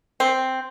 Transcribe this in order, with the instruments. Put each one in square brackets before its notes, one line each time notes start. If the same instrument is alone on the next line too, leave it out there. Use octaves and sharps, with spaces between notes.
[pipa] C4